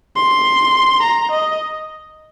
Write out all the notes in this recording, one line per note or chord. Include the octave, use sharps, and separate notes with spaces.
C6
A#5
D#5